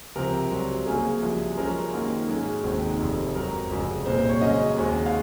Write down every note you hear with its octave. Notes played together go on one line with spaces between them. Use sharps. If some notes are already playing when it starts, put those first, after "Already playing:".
C#2 C3 F3 C4 A#4
C2 C3 F#3 C4
F#2 C#3 F#3 A#3 C#4 G#4
C2 C3 F3
F#2 F3 G#3 C#4 A#4
F#2 D#3 A#3 C#4
G#2 F#3 C#4 G#4
F1 D#2 D#3 G#3 C4
F1 F2 C3
G#2 F#3 C4 A#4
F1 F2 C#3
C2 A#2 G#3 C4 C5
C5
C#5
F#2 C#3 F#3 C#4 D#5
D#2 C#3 G#3 C4
F5